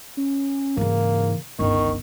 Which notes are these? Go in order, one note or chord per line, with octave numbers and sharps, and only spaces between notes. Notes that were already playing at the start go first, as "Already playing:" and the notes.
C#4
G#2 C#3 E3 A#3
G1 C#2 D#3 C#6